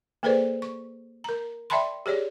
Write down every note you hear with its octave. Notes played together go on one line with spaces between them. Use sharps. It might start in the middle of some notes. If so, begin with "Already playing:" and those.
A#3 G#4 A4 B4 C5 D5
C#6
A#4 A#5
D5 E5 G5 A5 B5 C6
G4 G#4 C#5 D5